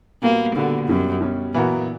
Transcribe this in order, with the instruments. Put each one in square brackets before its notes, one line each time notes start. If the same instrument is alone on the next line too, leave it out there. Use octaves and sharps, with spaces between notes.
[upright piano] A#2 G3 B3 F#4 [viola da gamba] A#3
[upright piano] A#2 G3 B3 F#4 [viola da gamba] D3
[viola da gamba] F#2 [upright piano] B2 G3 C#4
[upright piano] B2 G3 C#4
[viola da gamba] A#2 [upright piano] E3 B3 F#4 A#4